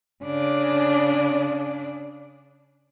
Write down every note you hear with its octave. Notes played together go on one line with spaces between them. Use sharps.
C#3 D4